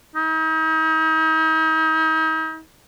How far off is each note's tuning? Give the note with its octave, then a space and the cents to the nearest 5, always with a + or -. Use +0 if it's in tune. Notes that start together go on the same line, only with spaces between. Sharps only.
D#4 +40